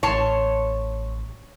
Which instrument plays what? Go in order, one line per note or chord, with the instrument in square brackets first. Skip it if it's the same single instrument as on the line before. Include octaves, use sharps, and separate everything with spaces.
[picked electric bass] A1 [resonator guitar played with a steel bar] C#5 [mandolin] A5 C6